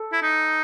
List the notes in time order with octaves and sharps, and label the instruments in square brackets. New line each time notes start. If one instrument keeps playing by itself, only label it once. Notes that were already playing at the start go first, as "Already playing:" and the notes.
Already playing: [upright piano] A4
[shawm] E4
D#4